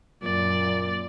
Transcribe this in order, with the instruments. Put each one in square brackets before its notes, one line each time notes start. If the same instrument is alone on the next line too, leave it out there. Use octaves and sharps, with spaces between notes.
[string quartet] F#2 [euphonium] A#2 [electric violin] D5